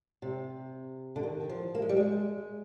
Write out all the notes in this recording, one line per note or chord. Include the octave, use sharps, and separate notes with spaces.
C3
D3
D#3
F3
A#3
G#3
G3
G#3